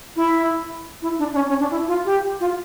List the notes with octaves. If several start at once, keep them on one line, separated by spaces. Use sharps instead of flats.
E4
E4
D4
D4
C#4
C#4
D4
E4
F4
G4
F4